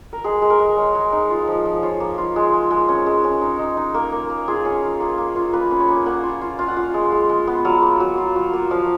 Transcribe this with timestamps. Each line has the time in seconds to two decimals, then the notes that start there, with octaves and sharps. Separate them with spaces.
0.13 A#4
0.24 G#3 G#4
0.42 G#3
0.50 A#4
0.59 G#3
0.77 G#3 C#5
0.95 G#3
1.13 D#4
1.30 F4
1.47 F3
1.65 F3
1.83 F4 C#5
2.00 A#3
2.18 F4
2.36 G#3
2.53 G#3
2.71 G#3
2.89 C#4
3.06 G#3
3.24 C#4
3.41 D#4
3.59 D#4
3.77 D#4
3.94 A#3 A#4
4.12 A#3
4.30 A#3
4.48 F4 G#4
4.65 C#4
4.83 F4
5.00 A#3
5.18 A#3
5.36 F4
5.53 A#3 B4
5.71 C#4
5.80 C#5
5.88 A#3
6.06 A#3 F#5
6.24 F4
6.41 F4
6.59 F4 F5
6.68 F#5
6.76 F4 F5
6.94 G#3
7.12 G#3
7.29 G#3
7.47 B3
7.65 F#3 F5
7.82 A#3
8.00 F#3
8.18 F4
8.36 F#3
8.53 A#3
8.71 F3 F5